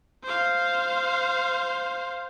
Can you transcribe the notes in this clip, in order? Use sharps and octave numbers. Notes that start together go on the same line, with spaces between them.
C5 F5